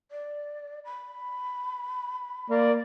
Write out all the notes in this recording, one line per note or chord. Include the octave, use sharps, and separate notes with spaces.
D5
B5
A#3 D5